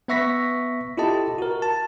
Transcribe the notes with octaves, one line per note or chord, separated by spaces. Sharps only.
B3 B4 E5 C#6 A#6 B6
E4 F4 G4 A4 D#5 A5
F#4 A#4
A5